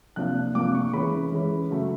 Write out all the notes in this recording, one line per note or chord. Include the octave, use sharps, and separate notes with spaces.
C3 F3 A#3 D4 F#6
C3 F3 A#3 D4 D6
C#6
E3 G#3 C#4 B5
E3 G#3 C#4
C#3 F#3 A3